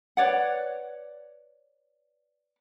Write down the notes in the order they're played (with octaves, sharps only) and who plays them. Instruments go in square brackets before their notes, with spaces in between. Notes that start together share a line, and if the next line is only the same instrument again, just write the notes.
[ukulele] B4 C#5 D5 F#5